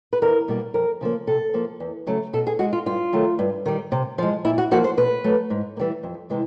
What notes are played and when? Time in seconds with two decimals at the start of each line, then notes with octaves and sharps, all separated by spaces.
0.13 B4
0.22 E2 A#4
0.48 B2 G3 A#3
0.74 F2 A#4
1.01 C#3 F3 A#3
1.27 C3 A4
1.54 F3 A#3
1.80 E2
2.07 C#3 F#3 A3
2.33 B2 A4
2.47 G#4
2.59 G#3 F#4
2.73 F4
2.86 G2 F4
3.13 D#3 F#3 A3
3.39 G2
3.66 D#3 G3
3.92 C3
4.18 F3 G#3
4.45 A#2 E4
4.58 F#4
4.71 F3 A#3 F#4
4.84 C5
4.97 B2 B4
5.24 F#3 A3
5.50 G#2
5.77 A#3
5.79 E3 G3
6.03 F2
6.30 C3 E3 G#3